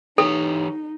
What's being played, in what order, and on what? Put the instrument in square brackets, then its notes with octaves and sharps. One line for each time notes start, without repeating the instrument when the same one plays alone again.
[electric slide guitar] E3 G4 C#5 [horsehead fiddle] D#4 [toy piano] A4